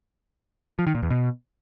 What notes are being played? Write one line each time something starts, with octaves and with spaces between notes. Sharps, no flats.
F3
D#3
A#2
E2
B2